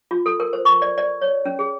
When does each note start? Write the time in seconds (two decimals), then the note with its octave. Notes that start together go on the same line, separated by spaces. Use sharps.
0.11 F4
0.26 A4
0.40 A#4
0.53 C5
0.65 C#6
0.82 D5
0.98 D5
1.21 C#5
1.45 C#4
1.59 G#4